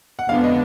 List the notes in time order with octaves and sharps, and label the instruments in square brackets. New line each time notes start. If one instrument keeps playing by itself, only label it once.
[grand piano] F#5
[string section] F2 D3 G#3 B3 D4 [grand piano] F5
[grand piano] D#5